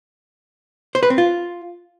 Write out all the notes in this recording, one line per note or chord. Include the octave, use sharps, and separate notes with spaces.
C5
B4
C4
F4